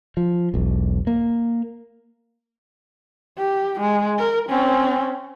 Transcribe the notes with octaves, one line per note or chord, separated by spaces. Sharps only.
F3
E1 B1
A#3
G4
G#3
A#4
C4 C#4